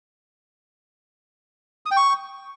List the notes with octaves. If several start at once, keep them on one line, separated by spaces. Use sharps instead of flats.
D#6
G5
C#6